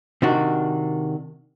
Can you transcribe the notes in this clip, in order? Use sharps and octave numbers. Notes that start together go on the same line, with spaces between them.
C3 D#3 D4 F#4